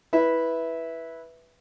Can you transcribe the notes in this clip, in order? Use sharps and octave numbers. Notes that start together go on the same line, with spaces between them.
E4 B4 E5